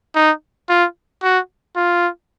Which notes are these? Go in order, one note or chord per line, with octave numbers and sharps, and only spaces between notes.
D#4
F4
F#4
F4